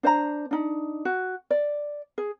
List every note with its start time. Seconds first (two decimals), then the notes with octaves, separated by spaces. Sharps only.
0.03 D4 C5 D#5 A#5
0.51 D4 D#4
1.05 F#4
1.50 D5
2.18 G#4